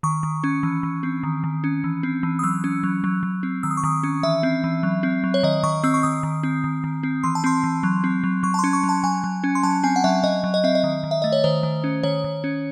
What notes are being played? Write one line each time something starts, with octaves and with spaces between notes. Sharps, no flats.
D#3 C#6
D#3
C#4
E3
E3
C4
D#3
D#3
C#4
E3
C4
E3
D#6
F#3 E6
C#4
F#3
F#3
F#3
C4
D#3 E6
D#6
C#6
D#3 D#6
C#4
E3 E5
C4
E3
F#3
C4
F#3
C#5
D#3 D#5
D#3 C#6
C4 E6
C#6
D#3 D#6
D#3
C4
D#3
D#3
C4
E3 C6
A5
C4 C6
E3
F#3
C4
F#3
F#3 C#6
A5
C#4 C6
C#6
F#3
A5
F#3 G#5
F#3
C#4
C6
F#3 A5
C4 G#5
F#5
F#3 E5
F#3 D#5
F#3
D#5
C4 E5
D#5
D#3
D#3
E5
A3 D#5
C#5
D#3 C5
D#3
C#4
D#3 C#5
D#3
C#4